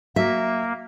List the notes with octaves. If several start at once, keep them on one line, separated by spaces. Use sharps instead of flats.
F#3 A#3 E5